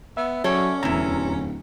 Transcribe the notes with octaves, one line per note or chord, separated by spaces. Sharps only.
B3 E5
F#3 C#4 A4 C#5 D5
D1 E2 C3 E3 A#5